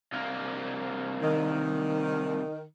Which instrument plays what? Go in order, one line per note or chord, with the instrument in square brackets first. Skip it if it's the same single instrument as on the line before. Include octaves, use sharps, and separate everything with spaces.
[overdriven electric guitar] C2 A#3
[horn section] D#3